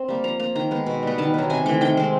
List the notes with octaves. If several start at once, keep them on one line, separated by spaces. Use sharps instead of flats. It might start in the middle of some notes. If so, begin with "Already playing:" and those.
Already playing: C4
G3 A#3
F3 A#5
A#3 A#5
D#3 A#5
G#3 B3
B2
G3 B3
D#3 A5
F#3 B3
C3 G#5
E3 A3 G5
D#3 G5
G#3 C4